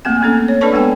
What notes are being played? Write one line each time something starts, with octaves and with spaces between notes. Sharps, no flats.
A3 A#3 C4 G#5
A3 A#3 C4 C#4 A4
C#5
D4 A4 B4 D5 A5 C#6
G#3 B3 A4 G5 G#5